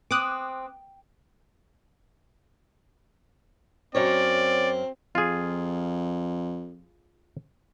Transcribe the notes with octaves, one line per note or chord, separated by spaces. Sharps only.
C4 D6 D#6 F#6
F#2 C4 A#4 C#5 D5
F2 F4 G#4